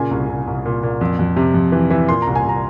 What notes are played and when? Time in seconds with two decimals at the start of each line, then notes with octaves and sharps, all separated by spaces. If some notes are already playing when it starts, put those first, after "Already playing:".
Already playing: A#2 C#3 G#5
0.11 C2
0.29 C2
0.47 C2
0.65 A#2
0.83 A#2
1.01 F2
1.19 F2
1.36 C3
1.54 F2
1.72 E3
1.90 E3
2.09 A#2 C6
2.22 A#5
2.27 C2
2.35 G#5
2.44 C2 A#5